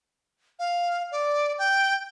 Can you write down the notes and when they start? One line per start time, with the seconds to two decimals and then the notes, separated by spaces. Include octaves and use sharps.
0.59 F5
1.12 D5
1.59 G5